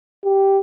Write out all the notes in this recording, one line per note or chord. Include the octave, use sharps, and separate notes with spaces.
G4